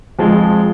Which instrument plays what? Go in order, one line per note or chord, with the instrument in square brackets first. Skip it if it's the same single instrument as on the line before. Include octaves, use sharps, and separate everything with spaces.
[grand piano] F2 F3 G#3